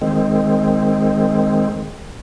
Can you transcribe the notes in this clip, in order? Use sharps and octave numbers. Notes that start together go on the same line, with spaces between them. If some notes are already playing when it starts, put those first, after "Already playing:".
D#3 G#3 C4